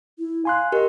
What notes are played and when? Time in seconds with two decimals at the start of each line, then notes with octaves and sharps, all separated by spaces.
0.19 E4
0.45 F5 G#5 C6 F#6
0.72 G4 A#4 D#5